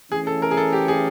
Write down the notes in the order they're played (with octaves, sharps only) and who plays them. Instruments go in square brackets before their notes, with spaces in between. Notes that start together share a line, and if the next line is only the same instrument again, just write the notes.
[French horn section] E3 A3 C#4 [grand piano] G#4
[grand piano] A4
A#4
G#4
A4
G4
G#4